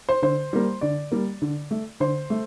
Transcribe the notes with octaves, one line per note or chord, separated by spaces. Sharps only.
C5
D3 C5
G3 A#3
D3 D5
G3 A#3
D3
A3
D3 C5
A3